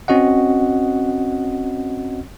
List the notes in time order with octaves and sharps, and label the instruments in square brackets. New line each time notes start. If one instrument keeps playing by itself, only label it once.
[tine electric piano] C4 C#4 F#4 D#5 F#5